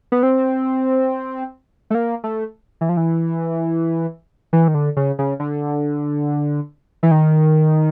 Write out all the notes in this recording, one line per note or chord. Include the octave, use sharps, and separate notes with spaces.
B3
C4
A3
A#3
A3
E3
F3
E3
E3
D#3
D3
C#3
C#3
D3
E3
D#3